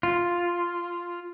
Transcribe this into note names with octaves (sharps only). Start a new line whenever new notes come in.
F4